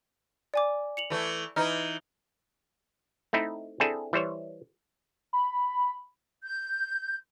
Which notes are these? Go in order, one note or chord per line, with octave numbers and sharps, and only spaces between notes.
D5 G#5 D6
C#7 F7 F#7
E3 A3
E3 D#4 F6
A3 C4 D#4 E4
C4 D4 E4 G#4 A4
E3 G3 C5 C#5
B5
G6